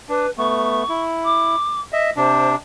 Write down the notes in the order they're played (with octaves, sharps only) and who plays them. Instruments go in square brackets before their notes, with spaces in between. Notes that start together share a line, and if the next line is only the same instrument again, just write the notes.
[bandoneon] D4 [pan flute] B4
[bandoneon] A3 B3 [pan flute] C#6
[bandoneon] E4
[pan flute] D6
[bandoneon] D#5 E5
[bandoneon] C3 D4 [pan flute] C5